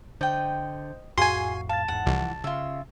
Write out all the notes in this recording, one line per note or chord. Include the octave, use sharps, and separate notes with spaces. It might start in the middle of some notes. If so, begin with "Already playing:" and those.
D3 C5 D#5 G5
F2 A2 F#4 G#4 F5 G#5 C6
F5 A5 A6
E2 G#2 F#5
C2 E3 F3
C#3 F4 E5